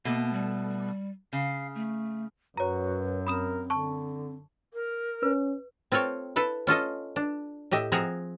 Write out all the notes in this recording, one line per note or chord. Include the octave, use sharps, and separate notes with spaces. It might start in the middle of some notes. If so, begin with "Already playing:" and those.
B2 A3 A#3
G3
C#3 F5
A3
F#2 F#4 B4 C#5 A#5
C4 A#4 B5 D#6 E7
D3 A5 C#6
A#4
C#4 B4
C4 F4 A4 C#5 G5
E4 A4 B4
C#4 F4 A4 D#5
D4
A2 G4 D#5 E5
F3 C4 G#4 E5 F#5 A#5